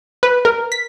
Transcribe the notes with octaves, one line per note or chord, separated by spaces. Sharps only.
B4
A#4
B6